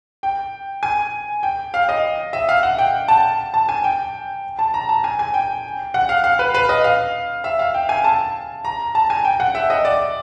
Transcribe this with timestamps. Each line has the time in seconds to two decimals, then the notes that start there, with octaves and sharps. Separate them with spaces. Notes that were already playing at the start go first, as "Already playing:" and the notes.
0.23 G5
0.83 G#5
1.43 G5
1.74 F5
1.89 D#5
2.33 E5
2.49 F5
2.63 F#5
2.78 G5
3.08 A5
3.54 A5
3.69 G#5
3.84 G5
4.59 A5
4.74 A#5
4.89 A5
5.04 G#5
5.19 G#5
5.34 G5
5.94 F#5
6.09 F5
6.24 F5
6.39 B4
6.54 B4
6.69 D#5
6.84 F5
7.44 E5
7.59 F5
7.74 G5
7.89 G#5
8.04 A5
8.65 A#5
8.95 A5
9.10 G#5
9.25 G5
9.40 F#5
9.55 E5
9.70 D#5
9.85 D5